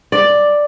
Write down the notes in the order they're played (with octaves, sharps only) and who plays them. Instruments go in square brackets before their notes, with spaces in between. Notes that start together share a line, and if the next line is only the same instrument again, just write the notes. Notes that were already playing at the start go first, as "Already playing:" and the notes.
[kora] D5